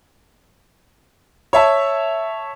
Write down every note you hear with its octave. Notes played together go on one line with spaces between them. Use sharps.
C#5 E5 A5